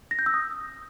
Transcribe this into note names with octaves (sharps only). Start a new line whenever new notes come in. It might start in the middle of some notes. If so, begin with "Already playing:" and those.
A#6
G6
E6
D#6